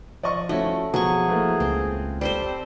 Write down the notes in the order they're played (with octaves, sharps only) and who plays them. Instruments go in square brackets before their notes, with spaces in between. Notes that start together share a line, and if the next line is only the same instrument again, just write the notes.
[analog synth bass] F3 [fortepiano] D5 D#5 C#6
[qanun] A3 [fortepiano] C#4 E4 F#4
[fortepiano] B2 [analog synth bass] F3 [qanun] F#3 C#6 [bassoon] G#4
[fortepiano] E3 A3 A#3
[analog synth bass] C#2 [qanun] C4
[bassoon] G3 [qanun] C4 A4 C5